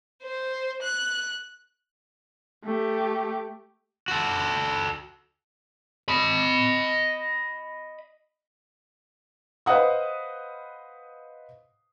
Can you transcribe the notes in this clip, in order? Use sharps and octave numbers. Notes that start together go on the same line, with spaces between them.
C5
F#6
A3 G4
F#4 A4
D#5 B5
B4 C5 D#5 F5 F#5 D#6